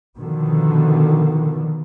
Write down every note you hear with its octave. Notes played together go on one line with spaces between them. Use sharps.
B2 D3 D#3 F3